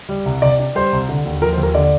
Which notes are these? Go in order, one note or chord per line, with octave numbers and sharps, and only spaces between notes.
G3
C2
C3 D5
D4
G3 C5
C2
D3
D#2
F3 A#4
C5
D#2
A#4
D3 D5